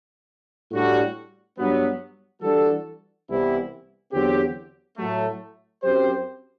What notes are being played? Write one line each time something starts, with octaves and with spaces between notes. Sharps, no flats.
A2 G3 D4 F#4
G2 F#3 B3
E3 G3 D4 F#4 A4
C2 C3 E3 B3 E4
E2 D3 F#3 C4 G4
A2 F#3 A3
F#2 F#3 C4 G4 C5